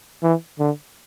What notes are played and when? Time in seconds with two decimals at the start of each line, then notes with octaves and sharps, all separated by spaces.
0.23 E3
0.59 D3